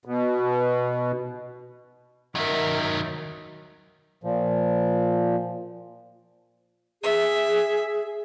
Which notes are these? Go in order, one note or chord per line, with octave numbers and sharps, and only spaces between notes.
B2
D#3 F#3 A#4 E5
A#2 F3
G#4 E5